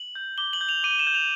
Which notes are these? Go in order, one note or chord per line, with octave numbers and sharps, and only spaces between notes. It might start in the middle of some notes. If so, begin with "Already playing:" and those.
Already playing: F#7
G6
D6 G7
F#7
G6
F7
D6 D#7
E7
G6
F7